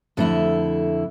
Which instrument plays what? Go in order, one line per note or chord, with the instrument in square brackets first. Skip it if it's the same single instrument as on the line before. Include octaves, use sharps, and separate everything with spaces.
[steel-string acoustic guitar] F2 D3 A3 E4